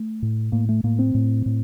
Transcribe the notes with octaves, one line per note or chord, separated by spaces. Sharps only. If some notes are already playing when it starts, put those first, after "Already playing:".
Already playing: A3
A2
A2 A#3
A3
A2 A#3
C4
A2
A2